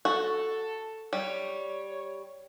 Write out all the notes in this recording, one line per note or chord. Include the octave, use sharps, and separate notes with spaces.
F#4 A4
G3 C#5